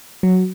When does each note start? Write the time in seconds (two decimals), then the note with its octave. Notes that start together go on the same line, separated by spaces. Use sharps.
0.23 F#3